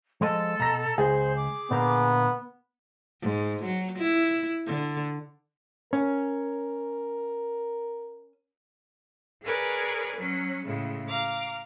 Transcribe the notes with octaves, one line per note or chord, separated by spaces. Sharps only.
F3 G#3 A4 D#5
B2 A#5 A#6
C#2 G#4 C5
D6
A#2 D3 B3 A#4
G#2
F#3
E4
D3
C#4 A#4
G#4 A#4 B4 C#5 D5 G#5
F#3 C#4
A2 C#3 G#3
F5 A#5 D6